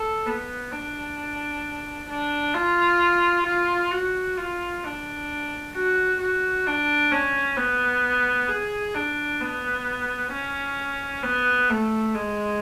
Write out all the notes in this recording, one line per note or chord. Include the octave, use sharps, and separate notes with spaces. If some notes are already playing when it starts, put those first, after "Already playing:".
Already playing: A4
B3
D4
D4
F4
F4
F#4
F4
D4
F#4
F#4
D4
C#4
B3
G#4
D4
B3
C#4
B3
A3
G#3